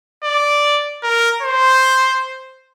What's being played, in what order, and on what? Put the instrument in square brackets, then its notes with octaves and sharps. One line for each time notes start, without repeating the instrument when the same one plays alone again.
[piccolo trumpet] D5
A#4
C5